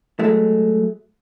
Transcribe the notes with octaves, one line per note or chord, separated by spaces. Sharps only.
F#3 G#3 A3